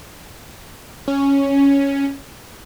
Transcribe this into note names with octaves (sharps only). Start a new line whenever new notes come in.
C#4